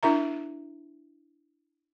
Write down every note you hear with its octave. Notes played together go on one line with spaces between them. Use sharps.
D4 E4 A#4 E5 A#5